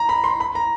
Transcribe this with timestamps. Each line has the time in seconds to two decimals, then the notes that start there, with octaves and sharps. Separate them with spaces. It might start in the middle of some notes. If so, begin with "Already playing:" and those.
Already playing: A#5
0.09 B5
0.24 C6
0.40 B5
0.55 A#5